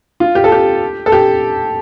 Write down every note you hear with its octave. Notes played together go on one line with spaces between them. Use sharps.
F4
G4
A4
G4
A4
G4